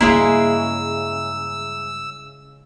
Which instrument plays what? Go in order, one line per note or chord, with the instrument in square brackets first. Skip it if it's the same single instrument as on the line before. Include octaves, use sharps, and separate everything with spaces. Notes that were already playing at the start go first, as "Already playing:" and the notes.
[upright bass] G2 A#3 [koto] C#3 G#3 E4 [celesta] E5 A#5 [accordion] E6